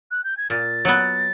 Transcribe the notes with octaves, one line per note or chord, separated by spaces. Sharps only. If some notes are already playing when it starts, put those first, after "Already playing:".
F#6
G6
G#6
A#2 A6
F#3 B3